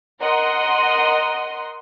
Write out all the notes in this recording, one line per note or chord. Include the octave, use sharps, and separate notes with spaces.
A#4 D#5 F#5 C6